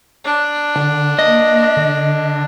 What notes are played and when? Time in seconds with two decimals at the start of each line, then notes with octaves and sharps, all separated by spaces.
0.24 D4
0.76 D3
1.19 A#3 D#5
1.77 D3